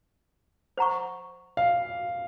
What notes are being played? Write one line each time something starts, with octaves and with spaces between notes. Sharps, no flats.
C5 F#5 A#5 C#6
F5